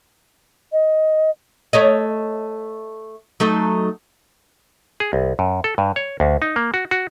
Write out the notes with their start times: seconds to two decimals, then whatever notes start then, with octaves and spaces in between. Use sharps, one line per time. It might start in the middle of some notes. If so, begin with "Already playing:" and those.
0.72 D#5
1.73 A3 C#5 D#5
3.40 F#3 A3 D#4
5.00 G#4
5.13 C2
5.39 F#2
5.64 A4
5.78 G2
5.96 C#5
6.20 D2
6.42 D#4
6.56 A#3
6.74 F#4
6.91 F#4